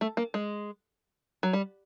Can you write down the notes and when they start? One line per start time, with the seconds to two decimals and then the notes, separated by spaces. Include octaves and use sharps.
0.01 A3
0.17 A#3
0.34 G#3
1.43 F#3
1.53 G3